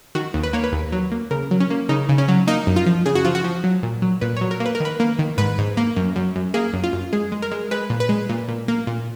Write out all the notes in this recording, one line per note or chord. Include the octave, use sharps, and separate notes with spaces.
D#3 F#4
D#2
B4
A#3 C#5
B4
D#2
F#3
A#3
C#3 A#4
F#3
C#4
A#3
C#3 D#4
C#3
C#4
F#3
A#3 D#4
F#2
F4
F3
C#3 G#4
F#4
F3 F4
F#4
F3
F#3
A#2
F#3
A#2 B4
F#3 C#5
A#4
A#3
B4
A#4
D#3 B4
A#3
D#3
G#2 B4
G#2
A#3
F#2
F#2
F#2
A#3 G#4
F#2
F4
F#2
G#3 G#4
G#3
A#4
G#3
G#3 B4
A#2
B4
G#3
A#2
A#2
A#3
A#2